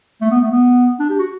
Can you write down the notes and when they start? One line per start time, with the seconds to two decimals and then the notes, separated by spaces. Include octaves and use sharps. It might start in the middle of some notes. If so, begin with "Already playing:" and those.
0.21 A3
0.31 B3
0.41 A3
0.51 B3
0.99 D4
1.10 G4
1.19 F#4